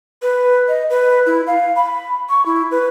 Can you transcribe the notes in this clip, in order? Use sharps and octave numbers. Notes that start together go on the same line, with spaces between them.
B4
D#5
B4
E4
F5
B5
C#6
E4
B4